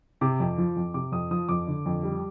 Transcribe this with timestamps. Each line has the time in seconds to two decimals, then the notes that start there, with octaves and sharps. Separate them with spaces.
0.21 C3 D6
0.40 F2
0.58 F3
0.76 F2
0.94 C3 D6
1.12 F2 D#6
1.31 F3 D#6
1.49 F2 D6
1.67 D3
1.86 F2
2.03 G3